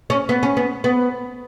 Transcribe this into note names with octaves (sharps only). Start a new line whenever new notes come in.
C#4
B3
C#4
B3
B3